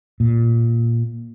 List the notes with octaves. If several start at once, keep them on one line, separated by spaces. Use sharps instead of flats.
A#2